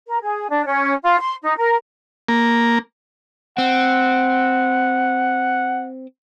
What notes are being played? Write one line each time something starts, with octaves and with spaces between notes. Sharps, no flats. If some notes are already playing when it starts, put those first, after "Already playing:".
A#4
G#4
D4
C#4
F4
C6
D#4
A#4
A#3
C4 F#5